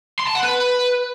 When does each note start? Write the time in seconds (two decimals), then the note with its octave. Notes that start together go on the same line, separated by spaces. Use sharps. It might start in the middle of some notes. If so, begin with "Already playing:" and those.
0.19 C6
0.27 A5
0.35 F#5
0.43 B4